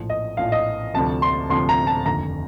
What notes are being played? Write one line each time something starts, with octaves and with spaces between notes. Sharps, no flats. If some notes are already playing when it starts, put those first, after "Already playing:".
Already playing: A#1 A2 F3
D#5
A#1 A2 F3 F5
D#5
D2 C3 F3 A5
C6
D2 C3 F3 C6
A#5
A5
F1 D#2 D3 A#5